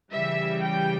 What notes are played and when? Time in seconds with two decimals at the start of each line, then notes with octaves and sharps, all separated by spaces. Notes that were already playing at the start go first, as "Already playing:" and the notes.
0.12 C#3 E3 G3 E5
0.63 G5